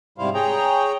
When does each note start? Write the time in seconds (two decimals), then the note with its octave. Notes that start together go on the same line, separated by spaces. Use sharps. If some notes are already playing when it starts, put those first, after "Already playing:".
0.18 G#2 C3 G3 E4 C5 F5
0.34 G#4 C#5 G5 A#5